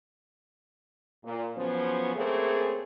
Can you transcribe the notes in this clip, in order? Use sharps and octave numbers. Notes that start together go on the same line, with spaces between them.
A#2
C#3 F3 F#3 B3 C#4 C5
C#3 A3 A#3 C4 G#4